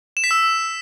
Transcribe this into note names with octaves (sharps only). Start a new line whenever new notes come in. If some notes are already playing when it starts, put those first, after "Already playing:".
E7
B6
E6